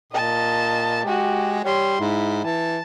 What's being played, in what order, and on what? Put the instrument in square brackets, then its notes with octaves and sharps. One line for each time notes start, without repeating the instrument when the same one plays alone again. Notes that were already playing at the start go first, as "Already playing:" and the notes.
[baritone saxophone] A#2 [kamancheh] D#5 A5
[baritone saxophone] G#3 [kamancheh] F#4 G4
[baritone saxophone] G3 [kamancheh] C#5 C6
[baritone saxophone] G#2 [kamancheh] E4
[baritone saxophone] E3 [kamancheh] A5